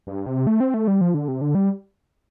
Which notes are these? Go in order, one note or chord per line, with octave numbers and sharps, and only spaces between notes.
G2
C3
A3
C4
A3
G3
F3
D3
C3
D3
G3